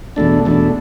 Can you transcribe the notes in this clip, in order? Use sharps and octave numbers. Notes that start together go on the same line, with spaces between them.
E2 B2 A3 D4
E2 B2 A3 D4